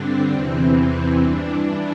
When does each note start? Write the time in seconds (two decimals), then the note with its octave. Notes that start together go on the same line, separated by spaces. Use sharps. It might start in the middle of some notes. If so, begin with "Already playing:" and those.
Already playing: G2 D3 C4 D4
0.30 E2 C3 E3 C4
1.20 G2 E3 D4